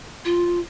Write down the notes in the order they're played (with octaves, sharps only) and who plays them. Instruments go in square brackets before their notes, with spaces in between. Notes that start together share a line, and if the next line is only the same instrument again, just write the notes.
[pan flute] F4